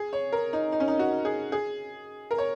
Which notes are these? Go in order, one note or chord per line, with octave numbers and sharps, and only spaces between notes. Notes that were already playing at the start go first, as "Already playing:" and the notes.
Already playing: G#4
C#5
A#4
D#4
D#4
C#4
D#4
F#4
G#4
G#4
A#4
C#5